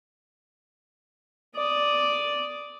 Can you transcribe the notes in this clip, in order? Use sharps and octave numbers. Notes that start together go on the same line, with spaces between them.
D5 D#6